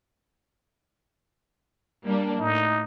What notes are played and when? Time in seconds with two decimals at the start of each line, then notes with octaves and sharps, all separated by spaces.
2.05 G3 A#3 D4
2.40 A2 D#4